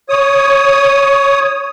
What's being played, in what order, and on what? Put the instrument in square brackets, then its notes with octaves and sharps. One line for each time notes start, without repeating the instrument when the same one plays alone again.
[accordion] C#5 D#6